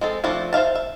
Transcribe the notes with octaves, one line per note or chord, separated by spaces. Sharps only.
G#3 C4 A4
F3 A3 C4 D4
C5 E5 F5 A5
E5